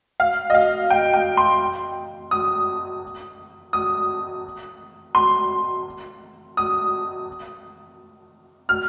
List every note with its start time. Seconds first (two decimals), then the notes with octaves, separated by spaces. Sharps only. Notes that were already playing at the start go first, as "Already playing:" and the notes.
0.20 F5
0.50 D#5
0.54 F5
0.90 G5
1.14 G5
1.37 C6
2.31 D#6
3.73 D#6
5.15 C6
6.57 D#6
8.69 F6